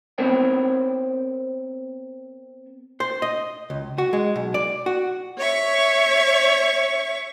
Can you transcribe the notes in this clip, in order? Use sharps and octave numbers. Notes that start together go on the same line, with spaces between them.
B3 C4 A#4 C5 C#5 G5
C5
D#5
C#2
F#4
G#3
B1
D5
F#4
C#5 E5 C#6